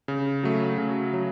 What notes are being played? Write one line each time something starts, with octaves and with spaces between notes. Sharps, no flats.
C#3
F#3 A3
C#3
F#3